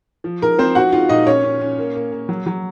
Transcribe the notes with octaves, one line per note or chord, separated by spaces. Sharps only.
F3
D#4 A#4
F3 C4 C5
D#4 F#4 F#5
D#4 F4 F5
A#2 D#4 D#5
C#4 C#5
C#4
C#4
A#3
A#3
A#3
F#3
F#3